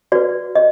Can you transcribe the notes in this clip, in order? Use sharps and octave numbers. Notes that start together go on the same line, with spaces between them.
F#4 B4 D5
D#5